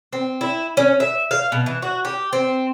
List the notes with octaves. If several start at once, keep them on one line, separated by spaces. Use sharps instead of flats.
C4
E4
C#4
E5
F5
B2
E3
F#4
G4
C4